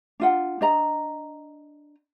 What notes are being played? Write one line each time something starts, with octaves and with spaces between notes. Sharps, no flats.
D4 F4 F#5
D4 D#5 A#5